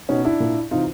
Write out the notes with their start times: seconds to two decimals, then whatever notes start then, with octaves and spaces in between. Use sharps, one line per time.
0.09 B2 C#4 D#4
0.25 D4 E4
0.40 A#2
0.71 C3 E3 D#4 F4